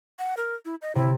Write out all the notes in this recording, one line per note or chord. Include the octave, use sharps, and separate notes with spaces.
F#5
A#4
E4
D#5
C3 E4